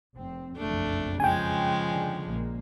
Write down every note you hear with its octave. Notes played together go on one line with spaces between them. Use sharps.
F1 C4
F#1 B1 F2 A3 D4
C#3 F3 G#3 G5 G#5
D#2 D3
A#1 A#2 A#3